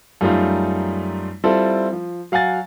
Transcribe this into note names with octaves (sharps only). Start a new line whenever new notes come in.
F#2 G3 A3 D#4 F4
G3 C4 E4 F4 A4
F3
F#3 F5 F#5 G#5 A6